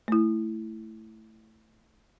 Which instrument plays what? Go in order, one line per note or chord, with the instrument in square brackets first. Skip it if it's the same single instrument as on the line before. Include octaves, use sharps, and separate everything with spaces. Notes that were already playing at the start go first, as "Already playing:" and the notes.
[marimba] A3 E4